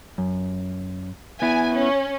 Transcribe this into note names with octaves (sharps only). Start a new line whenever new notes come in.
F#2
B3 E4 G#5
C#4